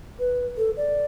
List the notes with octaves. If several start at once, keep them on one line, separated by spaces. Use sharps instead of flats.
B4
A4
D5